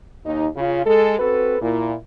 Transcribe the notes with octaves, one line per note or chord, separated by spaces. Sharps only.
D#2 D#4
C#3 F4
G#3 A4
C4 F#4 A4 B4
A#2 E4